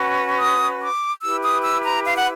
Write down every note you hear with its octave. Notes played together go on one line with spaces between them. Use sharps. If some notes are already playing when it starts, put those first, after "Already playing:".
Already playing: C#4 F#4 B4
D#6
D6
E4 G4 B4 E6
D#6
E6
A#5
F5
F#5